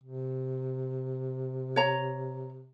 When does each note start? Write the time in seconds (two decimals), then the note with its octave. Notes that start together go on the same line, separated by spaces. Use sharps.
0.03 C3
1.76 C#5 A#5